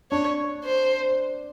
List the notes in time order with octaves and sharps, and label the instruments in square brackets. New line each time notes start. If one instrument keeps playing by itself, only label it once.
[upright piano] D4 [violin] C#5
[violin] C5